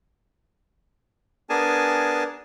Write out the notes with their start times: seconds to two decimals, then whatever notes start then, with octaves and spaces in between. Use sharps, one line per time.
1.50 B3 D4 G#4 A#4 G#5 A5